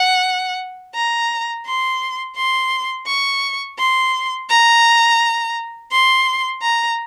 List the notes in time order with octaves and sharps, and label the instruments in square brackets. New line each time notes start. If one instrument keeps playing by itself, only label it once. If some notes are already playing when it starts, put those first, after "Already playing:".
Already playing: [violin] F#5
A#5
C6
C6
C#6
C6
A#5
C6
A#5